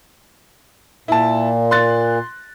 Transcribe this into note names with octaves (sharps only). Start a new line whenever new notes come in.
A#2 E4 A5
C6 F#6 A6